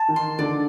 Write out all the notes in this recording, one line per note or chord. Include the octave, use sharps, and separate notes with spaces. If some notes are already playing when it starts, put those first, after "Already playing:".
Already playing: A5
D#3
C6
D3 D5